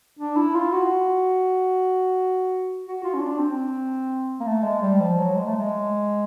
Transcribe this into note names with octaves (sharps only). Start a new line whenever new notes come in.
D4
E4
F4
F#4
F#4
F4
C#4
D4
C4
A#3
A3
G#3
G3
F3
F#3
G#3
A3
G#3